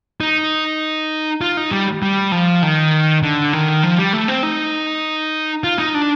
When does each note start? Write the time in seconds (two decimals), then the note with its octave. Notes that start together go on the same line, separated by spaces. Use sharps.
0.21 D#4
1.41 F4
1.57 D#4
1.71 G3
2.03 G3
2.32 F3
2.62 D#3
3.23 D3
3.53 D#3
3.83 F3
3.98 G3
4.13 A3
4.28 C4
4.43 D#4
5.64 F4
5.79 D#4
5.94 D4